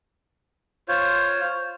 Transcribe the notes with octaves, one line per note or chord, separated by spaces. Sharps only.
F4 C5 C#5